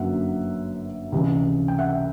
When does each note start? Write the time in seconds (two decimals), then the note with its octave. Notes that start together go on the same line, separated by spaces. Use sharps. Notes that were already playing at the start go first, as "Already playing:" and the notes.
Already playing: G1 F#2 D3 F#3 A#3 E5 F#5
1.12 C#2 C3 E3 G3
1.68 G5
1.78 E5 F#5